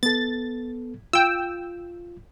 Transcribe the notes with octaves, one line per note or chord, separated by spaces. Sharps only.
B3 A4 A6
F4 G5 E6